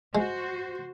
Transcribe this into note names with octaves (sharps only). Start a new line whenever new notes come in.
G#3 F#4 C5